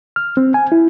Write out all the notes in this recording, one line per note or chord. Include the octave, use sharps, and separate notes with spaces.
F6
C4
G#5
E4